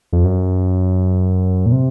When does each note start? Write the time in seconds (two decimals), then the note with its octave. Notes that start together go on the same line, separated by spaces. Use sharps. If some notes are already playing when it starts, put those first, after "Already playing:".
0.13 F2
0.25 F#2
1.66 A#2
1.72 C3